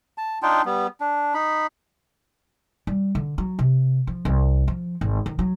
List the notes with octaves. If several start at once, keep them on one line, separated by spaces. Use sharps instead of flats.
A5
D4 D#4 F4 G5
G3 B3
D4
D#4 B5
G3
D3
F#3
C3
F3
C2
F3
G#1
D#3
F#3